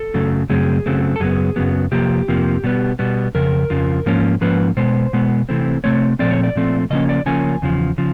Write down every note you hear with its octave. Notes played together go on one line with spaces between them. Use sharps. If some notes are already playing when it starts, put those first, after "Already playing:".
Already playing: A4
F#2 C#3 F#3 A3
F#2 C#3 F#3 A3 C4 G#4
F#2 C#3 F#3 A3 C4
A4
F#2 C#3 F#3 B3 G#4
F#2 C#3 F#3 B3
F2 C3 F3 A#3 G4
F2 C3 F3 A#3
B2 G3 B3
B2 G3 B3
F2 C#3 A#4
F2 C#3 F3
G#2 F3 A#3 C#4
G#2 F3 A#3 C#4 B4
B2 G#3 B3 C5
B2 G#3 B3
C3 E3 A3 C4
C3 E3 A3 C4 C#5
A#2 F3 A3 C4 D5
C#5
D5
A#2 F3 A3 C4
C#3 F3 A#3 C#4 D#5
D5
C#3 F3 A#3 C#4 G#5
E2 C#3 F3
C#3 F3